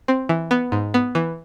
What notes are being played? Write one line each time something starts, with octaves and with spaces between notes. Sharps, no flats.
C4
E3
B3
G#2
B3
E3